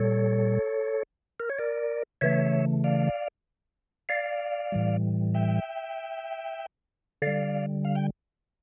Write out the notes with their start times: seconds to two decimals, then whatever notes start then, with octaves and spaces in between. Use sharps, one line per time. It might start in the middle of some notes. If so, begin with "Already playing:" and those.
Already playing: A#2 G3 A4 C#5
1.40 A#4
1.49 C#5
1.59 A#4 D5
2.21 C#3 E3 A3 C#5 E5
2.84 D5 F5
4.09 D5 F5
4.72 A2 E3 G3
5.34 E5 G5
7.22 D3 G3 D5 F5
7.85 F5
7.95 G5